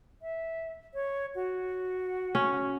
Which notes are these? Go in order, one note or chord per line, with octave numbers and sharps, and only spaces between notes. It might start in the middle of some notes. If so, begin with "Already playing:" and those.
E5
C#5
F#4
C#4